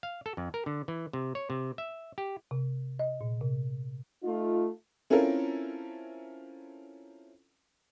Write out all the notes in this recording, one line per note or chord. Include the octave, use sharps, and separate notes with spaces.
F5
A4
F2
A#4
D3
E3
C3
C#5
C3
E5
G4
C3
D#5
A#2
C3
A3 D#4 F4
C4 C#4 E4 F4 A4 A#4